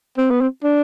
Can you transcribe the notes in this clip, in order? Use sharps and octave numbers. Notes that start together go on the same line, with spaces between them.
C4
B3
C4
D4